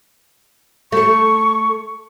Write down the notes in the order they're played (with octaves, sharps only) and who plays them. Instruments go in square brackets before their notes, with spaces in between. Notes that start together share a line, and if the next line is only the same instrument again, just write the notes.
[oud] A3 A4 [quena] C#6